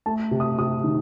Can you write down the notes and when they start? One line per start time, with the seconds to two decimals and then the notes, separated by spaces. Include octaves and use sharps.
0.06 A3 A5
0.31 C3
0.40 D#6
0.58 C3 D#6
0.84 D#3